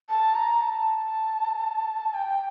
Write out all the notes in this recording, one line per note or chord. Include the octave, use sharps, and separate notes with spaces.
A5
A#5
A5
G5